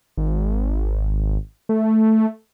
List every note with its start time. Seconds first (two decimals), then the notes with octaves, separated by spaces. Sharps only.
0.17 G#1
1.69 A3